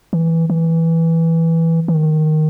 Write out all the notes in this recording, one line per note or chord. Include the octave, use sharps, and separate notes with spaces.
E3
E3
E3
D#3